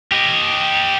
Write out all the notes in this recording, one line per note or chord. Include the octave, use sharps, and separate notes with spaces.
G4 D#5